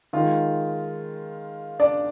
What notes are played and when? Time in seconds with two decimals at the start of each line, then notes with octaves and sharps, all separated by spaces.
0.13 D#3 G#3 F4
1.80 D4 D5